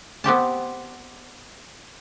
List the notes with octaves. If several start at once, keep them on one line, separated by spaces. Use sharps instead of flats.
B3 C4 G4 A5